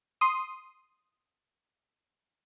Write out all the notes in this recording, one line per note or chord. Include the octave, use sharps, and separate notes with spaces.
C6 D#6